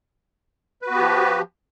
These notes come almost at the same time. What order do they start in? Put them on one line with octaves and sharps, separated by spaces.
B4 F#4 B3 G4 F3